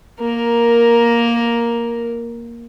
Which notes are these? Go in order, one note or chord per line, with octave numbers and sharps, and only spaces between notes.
A#3 A#4